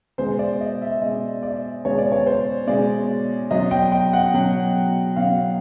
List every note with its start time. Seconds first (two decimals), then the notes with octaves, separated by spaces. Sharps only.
0.18 B2 G#3 C5
0.39 D5
0.61 D#5
0.81 E5
1.02 B2 G#3 D#5
1.43 D5
1.85 B2 G#3 C#5
1.98 D5
2.12 C#5
2.26 C5
2.67 B2 G#3 D5
3.51 B2 F#3 D#5
3.71 G5
3.92 G5
4.13 F#5
4.34 B2 F#3
5.16 B2 F#3 F5